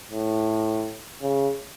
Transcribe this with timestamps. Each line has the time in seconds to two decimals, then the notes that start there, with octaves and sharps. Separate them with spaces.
0.11 A2
1.22 C#3